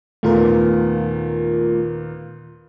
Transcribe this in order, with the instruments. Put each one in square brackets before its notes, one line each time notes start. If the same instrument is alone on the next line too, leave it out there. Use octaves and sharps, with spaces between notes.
[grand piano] D#2 A#2 B3 [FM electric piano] A3 F4 A#4